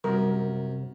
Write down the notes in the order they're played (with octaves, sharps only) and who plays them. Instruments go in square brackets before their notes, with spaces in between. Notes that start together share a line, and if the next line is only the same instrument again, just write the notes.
[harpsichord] F#2 [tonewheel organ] C3 [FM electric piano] G3 [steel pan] A#4